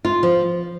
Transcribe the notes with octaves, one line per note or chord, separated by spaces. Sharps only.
F4
F3